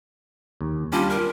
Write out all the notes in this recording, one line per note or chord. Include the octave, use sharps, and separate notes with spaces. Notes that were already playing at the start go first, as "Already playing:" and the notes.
D#2
G3 C#4 D4 F4
A#4